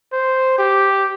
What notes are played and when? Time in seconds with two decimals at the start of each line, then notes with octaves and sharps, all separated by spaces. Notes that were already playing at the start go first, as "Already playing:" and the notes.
0.13 C5
0.58 G4